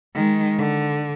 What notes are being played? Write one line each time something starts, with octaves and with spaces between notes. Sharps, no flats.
D#3 G#3
D3